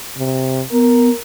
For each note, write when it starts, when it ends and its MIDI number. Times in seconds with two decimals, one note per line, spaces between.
0.17 0.63 48
0.72 1.09 59
0.72 1.19 70